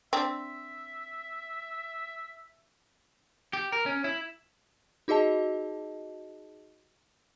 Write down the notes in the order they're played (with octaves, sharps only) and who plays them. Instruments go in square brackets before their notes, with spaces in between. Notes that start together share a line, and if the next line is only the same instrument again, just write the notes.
[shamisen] C4 D4 [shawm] E5
[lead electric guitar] G4
A#4
C#4
E4
[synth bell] D#4 F#4 G#4 D#5 A5